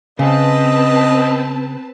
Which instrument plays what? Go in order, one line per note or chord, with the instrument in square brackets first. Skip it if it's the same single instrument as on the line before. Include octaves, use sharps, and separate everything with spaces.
[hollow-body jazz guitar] C#3 [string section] C4 B4 A5 [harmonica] D#5